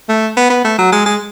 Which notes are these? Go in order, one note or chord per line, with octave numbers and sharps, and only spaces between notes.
A3
B3
B3
A3
F#3
G#3
G#3